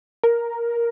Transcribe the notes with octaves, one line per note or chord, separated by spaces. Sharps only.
A#4